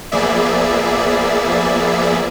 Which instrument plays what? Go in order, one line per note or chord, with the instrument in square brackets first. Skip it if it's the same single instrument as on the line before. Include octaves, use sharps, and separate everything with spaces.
[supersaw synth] F3 A#3 B3 G#4 D5 E5